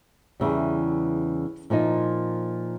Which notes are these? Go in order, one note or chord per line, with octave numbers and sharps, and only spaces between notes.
E2 C#3 E3 G3
A#2 F3 A#3 D#4